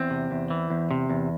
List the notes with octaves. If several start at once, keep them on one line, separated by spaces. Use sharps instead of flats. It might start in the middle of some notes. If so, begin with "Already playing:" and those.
Already playing: E2 C4
C3
E2
E3
E2
C3
E2